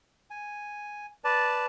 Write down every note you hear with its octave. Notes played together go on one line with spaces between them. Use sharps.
G#5
B4 D5 A5